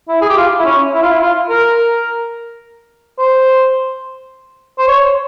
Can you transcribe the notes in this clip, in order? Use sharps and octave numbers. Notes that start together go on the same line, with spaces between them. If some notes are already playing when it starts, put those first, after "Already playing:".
E4
G#4
G4
F4
E4
C#4
E4
F4
E4
F4
A#4
C5
C5
C#5